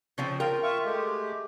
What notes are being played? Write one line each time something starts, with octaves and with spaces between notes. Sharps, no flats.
C#3 F3 C4
F4 A#4 G5
F4 E5 C#6
G#3 A3 G4